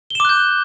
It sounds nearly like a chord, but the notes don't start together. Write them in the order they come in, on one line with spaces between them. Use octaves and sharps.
G7 E7 D6 F#6 G6